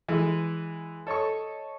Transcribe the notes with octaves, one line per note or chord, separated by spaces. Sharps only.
E3 G#3
A4 C#5 D#5 C#6